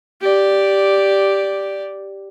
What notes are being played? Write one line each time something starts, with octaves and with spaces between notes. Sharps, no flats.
G4 D5